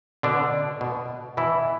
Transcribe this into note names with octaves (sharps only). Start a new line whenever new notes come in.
B2 D3 D4
B2
B2 E3 E4